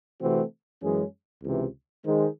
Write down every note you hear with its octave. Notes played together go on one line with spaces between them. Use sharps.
C3 E3 A3 C4 F#4
F#2 E3 G#3 C#4 G#4
C#2 C3 E3
D#3 G#3 D#4 G#4 C5